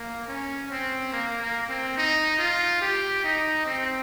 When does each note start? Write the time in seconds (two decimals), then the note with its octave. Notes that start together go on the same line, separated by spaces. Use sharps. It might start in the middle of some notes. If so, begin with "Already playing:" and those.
Already playing: A#3
0.28 C#4
0.71 C4
1.12 A#3
1.41 A#3
1.69 C4
1.97 D#4
2.39 F4
2.81 G4
3.24 D#4
3.66 C4